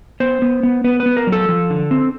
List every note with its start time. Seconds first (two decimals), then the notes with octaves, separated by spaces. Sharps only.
0.20 B3 C5
0.42 B3
0.63 B3
0.84 B3 B4
1.00 B4
1.06 B3
1.17 A#4
1.27 F#3
1.32 A4
1.49 F3
1.70 D3
1.91 C4